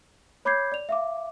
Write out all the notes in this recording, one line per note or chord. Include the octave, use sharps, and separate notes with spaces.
C#5 B5 D6 G6 G#6 C7
D5 F7
E5 F5 D6